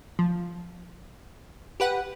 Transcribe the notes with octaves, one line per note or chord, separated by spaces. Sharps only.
F3
G4 B4 F#5